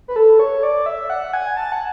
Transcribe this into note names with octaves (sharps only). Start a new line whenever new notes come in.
B4
A4
C#5
D5
E5
F#5
G#5
A5
F#5